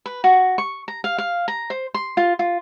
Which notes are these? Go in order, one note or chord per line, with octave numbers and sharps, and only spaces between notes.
B4
F#4
C#6
A#5
F5
F5
A#5
C5
C6
F4
F4